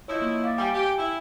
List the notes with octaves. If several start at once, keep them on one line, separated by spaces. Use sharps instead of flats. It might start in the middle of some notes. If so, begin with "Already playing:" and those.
F3 D#4 E4 C#5 D#5
A#3
F5 D6 A6
G3 G5 G#5
G4
E4